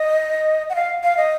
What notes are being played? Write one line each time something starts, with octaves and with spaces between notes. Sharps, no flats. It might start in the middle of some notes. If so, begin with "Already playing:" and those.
Already playing: D#5
F#5
F5
F5
D#5